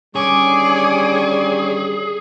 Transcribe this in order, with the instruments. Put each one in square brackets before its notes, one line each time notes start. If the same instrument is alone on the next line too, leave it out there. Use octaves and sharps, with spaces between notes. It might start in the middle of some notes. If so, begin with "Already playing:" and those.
[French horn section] D3 D#3 G3 [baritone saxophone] C#4 [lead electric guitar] G#4 [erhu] D6